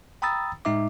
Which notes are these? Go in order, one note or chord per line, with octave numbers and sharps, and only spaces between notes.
G5 A#5 B5 D#6 E6 A6
A2 G#3 D#4 E5 D6